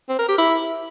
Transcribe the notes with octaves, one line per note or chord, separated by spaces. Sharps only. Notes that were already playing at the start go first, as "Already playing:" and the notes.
C4
A#4
G4
E4